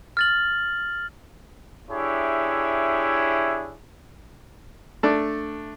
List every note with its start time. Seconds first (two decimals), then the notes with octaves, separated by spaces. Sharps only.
0.17 F6 A6 F#7
1.89 D4 E4 G4 G#4 C#5 E5
5.03 A3 D4 D5